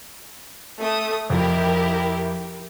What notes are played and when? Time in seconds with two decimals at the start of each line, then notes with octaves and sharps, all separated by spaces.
0.81 A3 D#6
1.30 F2 F3 E4 G4 A#4